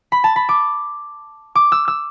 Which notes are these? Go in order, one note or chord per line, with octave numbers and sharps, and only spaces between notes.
B5
A5
B5
D6
D6
E6
E6